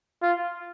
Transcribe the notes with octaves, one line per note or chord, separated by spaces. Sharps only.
F4